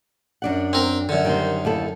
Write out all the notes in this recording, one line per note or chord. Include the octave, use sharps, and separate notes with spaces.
F#2 D4 F#5
C4 A#4
F#2 D3
D#3 G3 C5
D#2 E4 A4